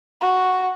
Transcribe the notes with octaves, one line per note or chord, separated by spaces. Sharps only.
F#4